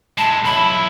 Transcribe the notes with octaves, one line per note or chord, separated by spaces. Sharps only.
G#3 E4 A5
B1 E4 B5